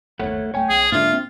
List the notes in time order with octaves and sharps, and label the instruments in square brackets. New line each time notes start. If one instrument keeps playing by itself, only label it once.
[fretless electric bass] G1 D#2 [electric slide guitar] A3 F#5 [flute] C#5
[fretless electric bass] D1 A3 [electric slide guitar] C#5 G#5 [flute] G5
[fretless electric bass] B1 [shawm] G#4
[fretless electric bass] G#2 D3 [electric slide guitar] A#3 D4 [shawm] F4 [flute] E5
[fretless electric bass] C4